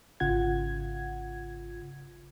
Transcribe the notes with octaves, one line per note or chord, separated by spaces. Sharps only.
G#1 C#3 F4 F#5 G#6